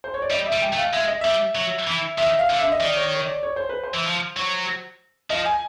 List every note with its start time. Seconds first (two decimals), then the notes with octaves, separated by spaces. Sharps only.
0.04 C5
0.14 C#5
0.22 D5
0.31 G3 D#5
0.46 E5
0.52 G3
0.62 G5
0.73 A3
0.78 F5
0.93 G#3 E5
1.08 D#5
1.21 G3 E5
1.55 F#3
1.87 E3
2.18 D#3 E5
2.39 F5
2.50 D3
2.60 E5
2.72 D#5
2.80 D#3 D5
2.96 C#5
3.12 C#5
3.27 D5
3.43 C#5
3.56 C5
3.69 B4
3.84 C5
3.94 E3
4.06 F3
4.37 F#3
5.30 F3 D#5
5.46 G#5